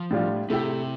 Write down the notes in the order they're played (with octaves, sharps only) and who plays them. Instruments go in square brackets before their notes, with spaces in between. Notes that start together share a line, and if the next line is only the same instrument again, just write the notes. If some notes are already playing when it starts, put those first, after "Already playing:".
Already playing: [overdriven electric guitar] F3
[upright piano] A2 G3 D4 F4
[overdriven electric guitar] C3 [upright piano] A3 E4 G4